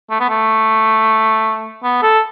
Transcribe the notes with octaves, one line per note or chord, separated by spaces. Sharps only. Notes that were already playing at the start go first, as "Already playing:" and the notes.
A3
B3
A3
B3
A4